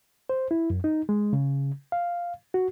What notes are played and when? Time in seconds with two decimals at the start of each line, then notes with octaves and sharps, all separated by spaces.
0.29 C5
0.51 E4
0.70 F#2
0.84 D#4
1.09 G#3
1.33 C#3
1.92 F5
2.54 F#4